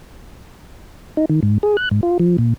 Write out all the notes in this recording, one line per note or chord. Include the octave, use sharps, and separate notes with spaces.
D#4
D#3
G#2
G#4
F#6
G#2
F4
F3
A#2